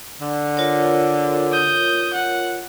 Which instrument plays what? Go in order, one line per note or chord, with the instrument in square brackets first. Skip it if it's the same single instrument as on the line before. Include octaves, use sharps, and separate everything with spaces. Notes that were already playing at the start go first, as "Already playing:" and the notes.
[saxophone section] D3
[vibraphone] F4 A#4 C#5
[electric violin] D#6 G6
F#5